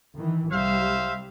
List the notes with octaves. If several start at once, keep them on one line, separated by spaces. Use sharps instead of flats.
D#3 E3
C2 G3 C5 E5 F5